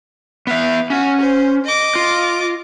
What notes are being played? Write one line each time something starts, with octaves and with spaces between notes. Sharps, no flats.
B3 E5 F5
C#4 F#4
C5
D#5 D6
F4